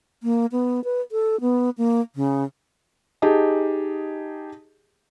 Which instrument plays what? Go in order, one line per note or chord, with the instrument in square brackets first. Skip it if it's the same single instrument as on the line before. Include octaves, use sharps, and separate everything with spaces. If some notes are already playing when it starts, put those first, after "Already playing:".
[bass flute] A#3
B3
B4
A4
B3
A#3
C#3
[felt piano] D#4 G4 G#4 D#5 A5